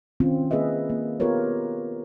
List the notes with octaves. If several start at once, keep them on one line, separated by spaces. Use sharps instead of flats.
D#3 C4 C#4 F4
A#3 G#4 B4 D#5 E5
A#3
B3 F4 G4 A#4 B4 C#5